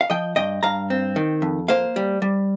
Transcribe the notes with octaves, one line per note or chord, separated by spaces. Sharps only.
F5
F3 D#5 G5
G2 D#5 G5
G2 F5 A#5
C4
D#3
F2
A#3 C5 F5
G3
G3